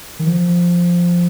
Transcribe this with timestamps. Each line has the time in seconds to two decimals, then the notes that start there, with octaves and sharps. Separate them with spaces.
0.19 D#3
0.27 F3